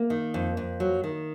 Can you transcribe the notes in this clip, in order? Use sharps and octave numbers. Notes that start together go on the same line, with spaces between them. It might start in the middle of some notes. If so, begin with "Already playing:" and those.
Already playing: A#3
D#3
F2
F2
F#3
D#3